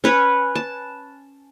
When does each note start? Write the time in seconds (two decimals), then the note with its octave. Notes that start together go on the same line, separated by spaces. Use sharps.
0.04 C#4 B4 C#5
0.55 A5